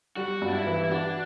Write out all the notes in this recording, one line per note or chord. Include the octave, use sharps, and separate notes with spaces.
G3 F#4
G2
D4
E4
E3
E4
D4 F#4